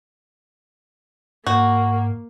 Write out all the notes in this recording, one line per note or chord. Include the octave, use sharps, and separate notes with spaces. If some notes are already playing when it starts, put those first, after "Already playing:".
G#2 A#3 F#4